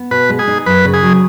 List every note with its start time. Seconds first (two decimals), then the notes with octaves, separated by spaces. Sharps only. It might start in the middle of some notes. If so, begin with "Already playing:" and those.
Already playing: B3
0.11 B2 B4
0.29 G#3
0.39 G#4
0.48 D#4
0.66 F#2 B4
0.85 C#3
0.94 G#4
1.03 F#3